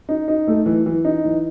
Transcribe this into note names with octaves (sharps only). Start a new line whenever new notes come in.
D#4
D#4
A3
E3
E3
D#4
E3